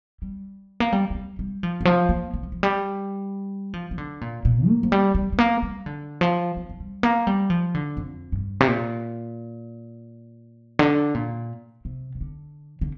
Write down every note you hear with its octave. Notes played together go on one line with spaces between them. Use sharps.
G3
A#3
G3
A#3
G3
G3
F3
D3
F3
A#3
A#3
G3
F3
G3
F3
F3
D3
A#2
A#2
A#3
F3
G3
G3
G3
A#3
G3
D3
F3
F3
F3
G3
A#3
G3
F3
D3
F2
G2
C3
A#2
D3
A#2
C3
C3
D3
D3